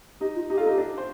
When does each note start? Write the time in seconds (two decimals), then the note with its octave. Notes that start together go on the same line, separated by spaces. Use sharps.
0.21 D#4 G4
0.35 F4
0.50 D#4 G4
0.57 F4 A4
0.66 D#4
0.69 G4
0.78 D4
0.98 C5